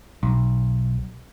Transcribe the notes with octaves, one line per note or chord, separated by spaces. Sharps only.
B1